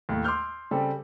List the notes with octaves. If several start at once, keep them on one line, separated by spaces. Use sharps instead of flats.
D#2 A2
C6 D6 E6 F6 G6
C#3 G3 C4 G4 A4